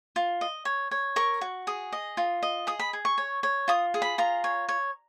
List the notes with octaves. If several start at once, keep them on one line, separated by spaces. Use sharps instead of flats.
F4
D#5
C#5
C#5
A#4 C#6
F#4
G#4 D#6
D#5
F4
D#5
G#4 D#6
B5
G#4
C#6
C#5
C#5
F4 D#6
G#4
B5
F4 A#5
C#5
C#5